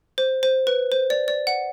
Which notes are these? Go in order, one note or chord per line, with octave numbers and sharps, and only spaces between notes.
C5
C5
B4
C5
D5
D5
F#5